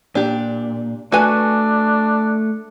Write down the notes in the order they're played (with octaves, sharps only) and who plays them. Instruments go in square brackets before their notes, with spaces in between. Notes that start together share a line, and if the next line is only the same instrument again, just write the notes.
[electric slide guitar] A#2 [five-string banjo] D4 G4
[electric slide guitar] A3 [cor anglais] D4 [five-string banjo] F#4 B4 G#5